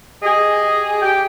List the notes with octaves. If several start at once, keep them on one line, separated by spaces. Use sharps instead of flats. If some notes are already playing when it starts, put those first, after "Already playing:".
G4 G#4 D#5
G4 G5